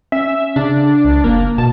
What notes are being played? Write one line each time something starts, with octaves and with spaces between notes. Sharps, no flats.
C#4 E5
C#3 D4
C#2
F#1 A#3
B2 A5